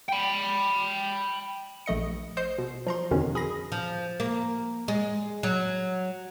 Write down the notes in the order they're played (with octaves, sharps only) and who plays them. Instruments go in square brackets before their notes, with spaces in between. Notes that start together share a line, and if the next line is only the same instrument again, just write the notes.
[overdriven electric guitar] G5 B5
[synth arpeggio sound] A#1 A3 D#5 C#7
C5 D#5 G6 C7
B2
F3 A#5 C6
F2 B2 D3 D#3 C#4
G#4 B5 A#6
[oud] F3
A#3
G#3
F#3